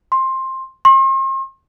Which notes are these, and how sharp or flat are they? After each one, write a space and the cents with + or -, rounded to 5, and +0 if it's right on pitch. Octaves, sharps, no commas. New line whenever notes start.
C6 +15
C6 +40